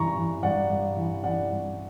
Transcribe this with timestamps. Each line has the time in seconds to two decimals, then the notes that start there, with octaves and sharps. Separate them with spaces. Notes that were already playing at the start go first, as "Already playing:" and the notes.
Already playing: G2 E3 A#5 C#6
0.16 E3
0.43 G2 D5 F#5
0.70 G2
0.97 E3
1.24 E3 D5 F#5
1.51 G2